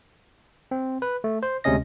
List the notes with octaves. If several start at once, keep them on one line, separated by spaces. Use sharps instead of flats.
C4
B4
A3
C5
D2 C3 G#3 C#4 D#5 A#6